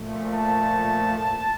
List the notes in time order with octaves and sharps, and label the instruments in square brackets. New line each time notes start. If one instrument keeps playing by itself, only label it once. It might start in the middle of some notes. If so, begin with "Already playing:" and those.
Already playing: [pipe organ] A#2 F3 A3
[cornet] A5